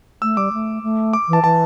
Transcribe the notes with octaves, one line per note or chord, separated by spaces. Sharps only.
A3 E6
G3 D6
A3
A3
D6
E3
A5
E3 A5